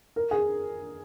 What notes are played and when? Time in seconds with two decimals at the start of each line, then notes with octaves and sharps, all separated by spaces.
0.16 A#4
0.31 G#4